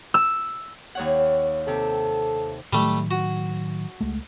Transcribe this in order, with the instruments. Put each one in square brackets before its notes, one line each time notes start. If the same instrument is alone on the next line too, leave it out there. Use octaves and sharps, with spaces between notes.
[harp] E6
D#2 C#5 F#5
[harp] C3 [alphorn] A4
[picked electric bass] A2 D#3 F#3 [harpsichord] G3 A3
[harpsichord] F#4
[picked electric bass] C#2 G#3 A3